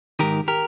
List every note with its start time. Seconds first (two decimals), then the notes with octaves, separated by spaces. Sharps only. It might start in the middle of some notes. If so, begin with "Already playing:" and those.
0.19 G#2 D#3 G4 A#4
0.48 G4 A#4